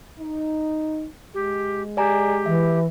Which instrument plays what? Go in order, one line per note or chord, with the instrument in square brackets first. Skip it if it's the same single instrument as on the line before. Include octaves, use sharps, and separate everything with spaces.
[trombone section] D#4
[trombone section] G#3 [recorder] G4
[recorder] G4 [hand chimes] D5 G#5 A#5
[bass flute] E3 [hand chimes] E5